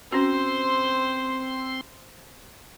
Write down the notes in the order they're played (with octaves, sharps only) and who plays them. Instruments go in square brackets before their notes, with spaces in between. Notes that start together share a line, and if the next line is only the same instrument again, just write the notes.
[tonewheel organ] C4 C6 [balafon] C#4 F#4 [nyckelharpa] C5